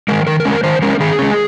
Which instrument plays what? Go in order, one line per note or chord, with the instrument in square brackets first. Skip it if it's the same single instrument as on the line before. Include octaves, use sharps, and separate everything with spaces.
[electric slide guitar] D#3 G#3 A#4
D#3 A#4
A#4
G#3 C#4
A#4
D#3 C5
G#3 C#4 A#4
D#3 G#4
G#3 C#4